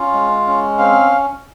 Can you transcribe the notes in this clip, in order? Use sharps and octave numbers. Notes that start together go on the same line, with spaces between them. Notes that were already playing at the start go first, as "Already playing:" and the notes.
Already playing: C#4 F4
G#3
C#4
C4 F5